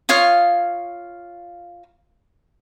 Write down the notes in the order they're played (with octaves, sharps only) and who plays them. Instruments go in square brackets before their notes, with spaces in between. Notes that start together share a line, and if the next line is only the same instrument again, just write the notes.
[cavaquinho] F4 C#5 F5 D#6